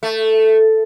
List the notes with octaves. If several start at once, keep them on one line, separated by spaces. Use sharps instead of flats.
A3